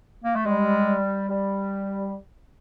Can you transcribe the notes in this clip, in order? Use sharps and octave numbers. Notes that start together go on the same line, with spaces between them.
A#3
A3
G3 G#3
G3